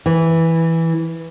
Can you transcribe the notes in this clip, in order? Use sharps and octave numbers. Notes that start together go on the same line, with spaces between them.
E3